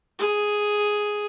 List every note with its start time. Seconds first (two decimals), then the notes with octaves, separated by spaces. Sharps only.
0.19 G#4